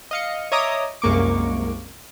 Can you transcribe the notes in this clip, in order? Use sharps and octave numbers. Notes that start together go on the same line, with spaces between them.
D#5 F5 C#7
C#5 D#5 E5 A#5 D6 D#6
C2 F#2 G#3 A#3 C#6 D6